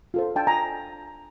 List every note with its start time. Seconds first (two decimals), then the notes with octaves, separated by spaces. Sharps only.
0.14 F4 A4 C5
0.36 D4 G5 A5
0.47 G#5 A#5